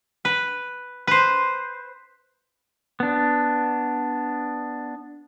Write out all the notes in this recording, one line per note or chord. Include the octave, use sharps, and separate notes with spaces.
B4
B4 C5
B3 D4